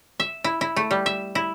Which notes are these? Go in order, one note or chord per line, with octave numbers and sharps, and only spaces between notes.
E5
E4
E4
A3
G3
E5
E4